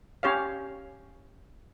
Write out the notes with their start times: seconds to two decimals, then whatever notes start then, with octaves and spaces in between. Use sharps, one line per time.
0.23 C#4 G4 C#5 F5